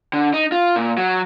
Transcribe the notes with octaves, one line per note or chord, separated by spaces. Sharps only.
D3
D#4
F4
A#2
F#3